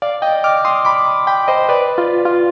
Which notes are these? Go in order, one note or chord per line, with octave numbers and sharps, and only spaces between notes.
D5 F5
D#5 G5
D6 F6
C6 D#6
B5 D6
G5 B5
C5 D#5
B4 D5
F4
F4